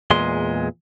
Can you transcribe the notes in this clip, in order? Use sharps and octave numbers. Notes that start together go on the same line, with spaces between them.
E2 A#2 G#3 C6